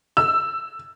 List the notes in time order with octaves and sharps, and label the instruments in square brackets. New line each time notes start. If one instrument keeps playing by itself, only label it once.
[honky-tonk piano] E6